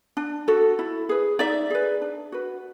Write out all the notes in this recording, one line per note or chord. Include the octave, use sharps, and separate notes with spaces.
D4
F#4 A4
E4
G#4 B4
D#4 D5 E5
G#4 B4
D4
F#4 B4